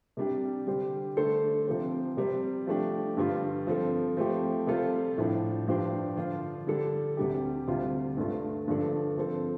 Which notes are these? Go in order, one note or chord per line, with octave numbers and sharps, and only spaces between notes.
C3 G3 D4 G4
D3 G3 D4 G4 C5
D3 A3 D4 A4 C5
C3 F3 C4 G4 C5
C3 G3 C4
F3 A3 D4 G4
G2 D3 G3 F4
F3 C4 A4
F3 A3 C4 G4
C3 G3 F4 A4 C5
A2 F3 D4
G2 F3 D4 G4 C5
D3 F3 D4 F4 C5
D3 G3 D4 A4
D2 C3 G3 D4 G4
D2 C3 G3 F4 C5
G2 D3 A3 F4
G2 D3 F3 D4 A4
F3 C4 A4